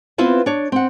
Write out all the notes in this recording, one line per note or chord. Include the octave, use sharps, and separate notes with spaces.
B3 C4 E4 F4 B4 E5
D4 C#5
C4 F#5